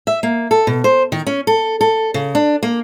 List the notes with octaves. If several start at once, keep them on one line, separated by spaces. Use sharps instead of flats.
E5
A#3
A4
B2
C5
D#3
C#4
A4
A4
C#3
D4
A#3